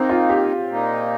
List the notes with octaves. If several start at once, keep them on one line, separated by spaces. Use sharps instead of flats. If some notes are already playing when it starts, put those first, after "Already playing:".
Already playing: D#3 A#3 C4 D#4
F4
G4
A#2 A#3 D#4